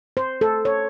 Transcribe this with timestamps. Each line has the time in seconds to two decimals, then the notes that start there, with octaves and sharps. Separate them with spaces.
0.17 C5
0.41 A4
0.65 C#5